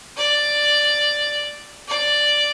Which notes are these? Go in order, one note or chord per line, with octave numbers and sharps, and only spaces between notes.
D5
D5